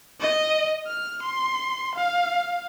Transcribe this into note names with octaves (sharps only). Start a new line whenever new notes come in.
D#5
F6
C6
F5